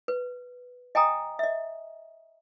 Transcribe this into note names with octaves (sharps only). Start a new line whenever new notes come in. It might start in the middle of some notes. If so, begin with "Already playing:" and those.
B4
D#5 G5 G#5 A#5 D#6
D#5 E5